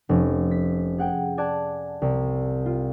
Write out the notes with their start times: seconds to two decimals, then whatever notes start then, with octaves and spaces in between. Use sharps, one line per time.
0.09 F1 C#4
0.51 B6
0.98 G#4 F#5 G5
1.38 D5 G#5 A5 F#6
2.02 C2
2.66 F4